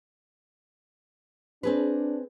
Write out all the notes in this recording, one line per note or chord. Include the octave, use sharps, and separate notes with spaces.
C4 D4 G#4 B4